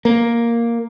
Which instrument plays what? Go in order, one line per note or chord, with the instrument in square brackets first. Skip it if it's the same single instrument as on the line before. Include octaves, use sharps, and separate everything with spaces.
[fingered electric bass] A#3